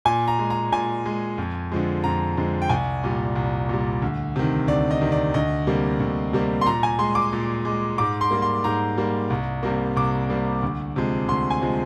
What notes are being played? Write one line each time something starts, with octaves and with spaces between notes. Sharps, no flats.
A#2 G#5
A#5
G#3
A#5
A#2 G#5
G#3
F2
D3 F3 G#3
F2 A#5
D3 F3 G#3
G5
C2 G#5
A#2 G3
C2
A#2 G3
D2
C3 D#3
D2 D5
D#5
C3 D#3
D5
D2 D#5
C3 G3 A#3
D2
C3 G3 A#3
C6
A#2 A#5
G#5
G#3 C6
D6
A#2
G#3
G#2 D6
C6
G3 A#3
C6
G#2 A#5
G3 A#3
C2
C3 G3 A#3
C2 D6
C3 G3 A#3
D2
C3 F3 G#3
D2 C6
G#5
C3 F3 G#3